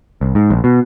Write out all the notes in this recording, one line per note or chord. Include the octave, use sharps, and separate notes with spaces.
C2
G#2
A#1
B2